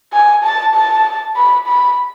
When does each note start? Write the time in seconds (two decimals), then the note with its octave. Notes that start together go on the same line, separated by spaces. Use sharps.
0.13 G#5
0.44 A5
0.74 A5
1.36 B5
1.68 B5